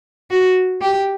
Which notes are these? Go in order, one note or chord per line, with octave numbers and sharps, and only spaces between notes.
F#4
G4